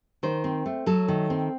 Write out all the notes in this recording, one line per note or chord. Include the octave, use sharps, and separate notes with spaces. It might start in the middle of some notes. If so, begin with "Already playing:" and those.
D#3 C5
C4
A3
F#3 A4
D#3
C4